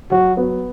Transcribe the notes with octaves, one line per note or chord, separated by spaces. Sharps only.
F#3 F#4
B3